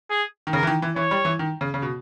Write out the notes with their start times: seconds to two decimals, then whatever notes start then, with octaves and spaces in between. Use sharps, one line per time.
0.10 G#4
0.47 D#3
0.53 C#3 A#4
0.63 E3
0.67 D#3
0.82 E3
0.96 E3 C#5
1.11 G3
1.25 E3
1.39 D#3
1.61 C#3
1.74 C#3
1.82 B2